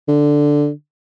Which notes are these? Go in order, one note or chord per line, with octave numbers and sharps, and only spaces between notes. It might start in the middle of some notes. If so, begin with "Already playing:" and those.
D3